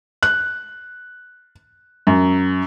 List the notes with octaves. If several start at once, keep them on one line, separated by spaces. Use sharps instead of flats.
F#6
F#2